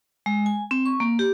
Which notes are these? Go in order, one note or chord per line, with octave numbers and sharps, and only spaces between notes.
G#3
G#5
C4
C#6
A#3
G4